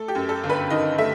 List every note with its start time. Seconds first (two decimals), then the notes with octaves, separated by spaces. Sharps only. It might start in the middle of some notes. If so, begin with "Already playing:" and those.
Already playing: A3 A4
0.08 G4
0.15 F#2
0.29 A4
0.44 G1
0.50 B4
0.70 D#3 D#5
0.98 A3 E5